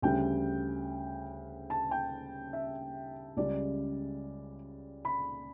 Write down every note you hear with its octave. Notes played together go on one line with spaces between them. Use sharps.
D2 C#3 G3 G5
A5
G5
E5
C#2 C#3 G3 D5
B5